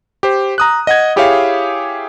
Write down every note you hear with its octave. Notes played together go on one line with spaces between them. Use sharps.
G4 C5
A#5 D#6 F#6
D#5 F#5 G#6
E4 G4 G#4 C#5 E5 F5